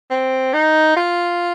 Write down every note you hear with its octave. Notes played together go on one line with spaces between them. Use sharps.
C4
D#4
F4